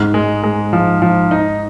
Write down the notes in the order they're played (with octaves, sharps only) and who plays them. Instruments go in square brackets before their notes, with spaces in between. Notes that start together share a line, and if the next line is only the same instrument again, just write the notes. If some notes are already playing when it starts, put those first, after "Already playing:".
Already playing: [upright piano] G#2
[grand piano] G#3
G#3
F3
F3
D#4